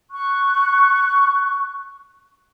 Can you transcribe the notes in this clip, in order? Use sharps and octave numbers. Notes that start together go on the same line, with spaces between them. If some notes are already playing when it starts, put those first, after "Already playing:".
C#6 F#6